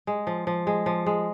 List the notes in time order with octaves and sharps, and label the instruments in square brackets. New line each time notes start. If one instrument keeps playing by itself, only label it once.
[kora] G#3
F3
F3
G#3
F3
G#3